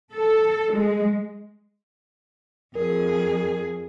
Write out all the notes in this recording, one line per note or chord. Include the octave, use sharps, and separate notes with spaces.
A4
G#3
F2 G#4 A#4